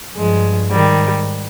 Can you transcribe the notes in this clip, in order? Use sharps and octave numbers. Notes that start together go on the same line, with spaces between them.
G2 F3 G#3
G#2 D#3 G3